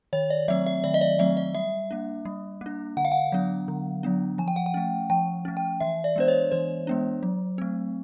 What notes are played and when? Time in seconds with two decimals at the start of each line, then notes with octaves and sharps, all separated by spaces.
0.13 D#3 C#5
0.30 D5
0.48 F#3 A3 C4 E5
0.66 E5
0.84 D#3 D5
0.94 D#5
1.01 D5
1.19 F#3 A3 C4 E5
1.37 D#5
1.55 G3 E5
1.91 A#3 D4
2.25 G3
2.61 A#3 D4
2.97 D3 F#5
3.05 F5
3.12 F#5
3.32 F#3 B3 D4
3.68 D3
4.03 F#3 B3 D4
4.38 F3 G#5
4.48 G5
4.56 F#5
4.66 G5
4.74 A3 C#4
5.10 F3 G5
5.45 A3 C#4
5.57 G5
5.81 E3 E5
6.04 D5
6.16 G#3 B3 D4 C5
6.28 C#5
6.52 E3 C5
6.87 G#3 B3 D4
7.23 F#3
7.58 A3 C4